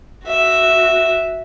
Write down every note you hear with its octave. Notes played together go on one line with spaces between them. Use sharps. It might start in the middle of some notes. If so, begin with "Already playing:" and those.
F#4 E5